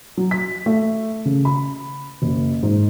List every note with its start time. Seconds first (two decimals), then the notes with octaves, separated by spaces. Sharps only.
0.17 F#3
0.31 B6
0.66 A3
1.25 C#3
1.45 B5
2.22 F#1
2.63 G#2